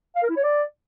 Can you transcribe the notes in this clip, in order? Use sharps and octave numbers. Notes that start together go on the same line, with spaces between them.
F5
A#4
E4
C#5
D5